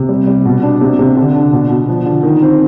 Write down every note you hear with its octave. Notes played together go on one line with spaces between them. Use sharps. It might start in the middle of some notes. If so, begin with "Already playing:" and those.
Already playing: C3
G3
G3
B2
D4
C3
C3
D3
D4
B2
B2
F3
D3
D#3
C4